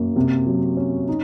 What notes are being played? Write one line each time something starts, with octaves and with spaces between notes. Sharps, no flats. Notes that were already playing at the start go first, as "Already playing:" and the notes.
Already playing: F#2 A#3
C3
F#3
C#4
D#4